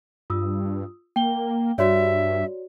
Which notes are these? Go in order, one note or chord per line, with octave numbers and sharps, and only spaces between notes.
G2 F4 D#6 E6
A#3 G5 G7
G2 F#4 C#5 D5 E5